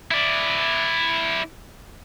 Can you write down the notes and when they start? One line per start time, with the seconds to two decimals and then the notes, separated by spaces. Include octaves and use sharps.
0.11 E4 D5